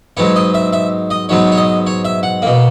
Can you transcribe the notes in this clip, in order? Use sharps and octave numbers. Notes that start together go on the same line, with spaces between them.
G#2 F#3 B3 C#5
D#5
E5
E5
D#5
G#2 F#3 B3 C#5
C#5
D#5
C#5
E5
F#5
B2 A#3